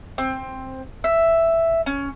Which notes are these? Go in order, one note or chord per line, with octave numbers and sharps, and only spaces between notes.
C4
E5
C#4